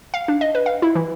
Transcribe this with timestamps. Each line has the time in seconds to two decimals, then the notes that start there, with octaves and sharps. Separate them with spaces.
0.14 F5
0.28 D4
0.41 D#5
0.55 B4
0.66 F5
0.82 E4
0.95 E3